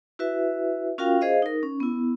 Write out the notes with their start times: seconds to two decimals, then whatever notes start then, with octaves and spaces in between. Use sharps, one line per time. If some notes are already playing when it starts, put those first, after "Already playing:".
0.19 E4 F#4 B4 E5
0.98 C#4 F4 F#4 A#4 F5 G5
1.21 G#4 C5 D#5 F5
1.42 D#4 A#4
1.63 C#4
1.80 B3 E4